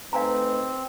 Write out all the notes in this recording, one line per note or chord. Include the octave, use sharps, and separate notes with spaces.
A3 C4 D#4 B4 F5 G#5 A#5